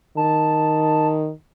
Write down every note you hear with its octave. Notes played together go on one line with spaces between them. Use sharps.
D#3 A5